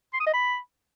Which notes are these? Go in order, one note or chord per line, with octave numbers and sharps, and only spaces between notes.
C6
D#6
D#5
B5